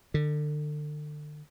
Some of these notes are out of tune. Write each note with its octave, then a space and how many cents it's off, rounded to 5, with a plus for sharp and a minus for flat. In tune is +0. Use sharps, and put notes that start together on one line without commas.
D3 +30